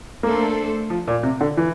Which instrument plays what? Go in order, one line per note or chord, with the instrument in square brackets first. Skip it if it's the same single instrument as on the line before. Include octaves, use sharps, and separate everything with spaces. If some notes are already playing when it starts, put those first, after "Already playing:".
[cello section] A3 D4 A4 C5 [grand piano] A#3
[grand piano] F3
A#2
C3
D3
E3